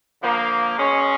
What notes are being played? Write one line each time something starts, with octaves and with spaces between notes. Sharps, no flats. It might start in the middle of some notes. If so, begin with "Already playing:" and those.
D3 F3 A#3
B2 G#3 C#4